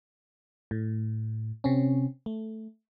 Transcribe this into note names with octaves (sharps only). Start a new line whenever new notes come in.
A2
C3 C4 C#4
A3